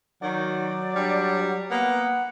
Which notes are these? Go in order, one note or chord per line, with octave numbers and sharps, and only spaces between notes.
D#3 F#3 F#4 D5
G3 D4
A#3 B3 F#5